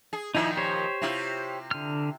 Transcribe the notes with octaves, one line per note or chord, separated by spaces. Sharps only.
G#4
A#2 D#3 F3 D#4 E4
G4 C5 C#5
C3 E4 F4
D3 F6